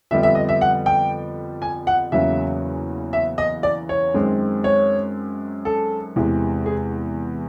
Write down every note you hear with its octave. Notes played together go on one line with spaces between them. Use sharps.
F2 D3 G3 B3 E5
E5
D#5
E5
F#5
G5
G#5
F#5
E2 C#3 F#3 A#3 E5
E5
D#5
D5
C#5
F#2 D#3 G#3 C4
C#5
A4
E2 C3 E3 G#3
G#4